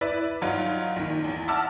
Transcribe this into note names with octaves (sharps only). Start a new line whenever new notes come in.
E4 B4 D5 E5
G2 F#3 D#4 F4
A#1 D#3
A1 E2
E5 F#5 A5 D6 E6 F6